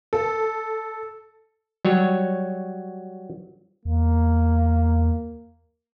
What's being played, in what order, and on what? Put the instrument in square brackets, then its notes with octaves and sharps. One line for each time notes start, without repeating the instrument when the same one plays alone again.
[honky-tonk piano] A4
[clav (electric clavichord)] F#3 G3 C#5
[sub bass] E2 [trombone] A#3